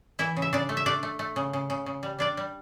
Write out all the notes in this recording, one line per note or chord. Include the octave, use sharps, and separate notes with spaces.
E3 E4 E5
C#3
E5
C#3 D4 D5
A3
E5
A3 D4 D5
A3
A3
C#3
C#3
C#3
C#3
G3
G3 D4 D5
G3